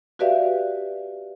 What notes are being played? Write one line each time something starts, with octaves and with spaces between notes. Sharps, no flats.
F#4 G4 B4 D5 E5 F5